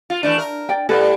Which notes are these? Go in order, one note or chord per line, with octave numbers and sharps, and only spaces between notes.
F4
E3 A3 D4
A#4
D5 G5
A2 G3 A4 B4